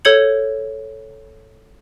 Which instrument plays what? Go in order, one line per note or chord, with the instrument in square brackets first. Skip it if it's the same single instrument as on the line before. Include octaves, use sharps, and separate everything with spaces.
[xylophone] A4 C#5 G6 G#6 C#7 F#7